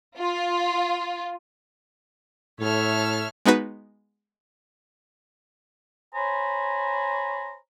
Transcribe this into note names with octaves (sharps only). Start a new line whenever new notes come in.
F4
A2 A4 C#5 E5 F6
G#3 B3 D#4 F#4 B4
C5 C#5 G#5 A#5 B5